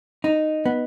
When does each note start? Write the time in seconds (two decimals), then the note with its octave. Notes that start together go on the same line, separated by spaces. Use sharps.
0.24 D#4
0.66 B3